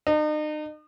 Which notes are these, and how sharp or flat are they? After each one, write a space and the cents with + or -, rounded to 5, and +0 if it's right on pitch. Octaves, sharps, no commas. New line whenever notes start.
D#4 -40